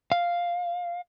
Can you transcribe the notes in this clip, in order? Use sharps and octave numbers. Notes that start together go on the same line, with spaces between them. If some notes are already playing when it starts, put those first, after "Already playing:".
F5